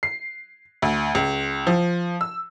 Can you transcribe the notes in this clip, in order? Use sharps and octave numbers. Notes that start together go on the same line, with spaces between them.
C7
D2
C#2
F3
E6